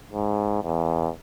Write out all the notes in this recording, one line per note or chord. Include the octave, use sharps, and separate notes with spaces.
G#2
E2